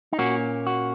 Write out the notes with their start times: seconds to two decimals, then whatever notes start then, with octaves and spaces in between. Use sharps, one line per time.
0.13 D#4
0.19 A#2 A#3 C#4 F#4
0.67 F#4